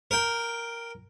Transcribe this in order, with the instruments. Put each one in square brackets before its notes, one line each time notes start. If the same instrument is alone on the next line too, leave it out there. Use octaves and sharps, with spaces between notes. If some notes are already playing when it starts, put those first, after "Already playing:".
[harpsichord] A#4 G5